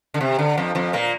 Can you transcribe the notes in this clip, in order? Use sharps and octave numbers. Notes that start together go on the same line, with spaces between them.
D3
C3
D3
F2 F3
F2 F3
A#2 A#3